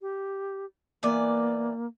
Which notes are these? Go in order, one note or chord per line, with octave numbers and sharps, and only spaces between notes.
G4
E3 A#3 B3 D5